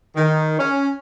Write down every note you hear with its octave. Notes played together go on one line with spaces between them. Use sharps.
D#3
C#4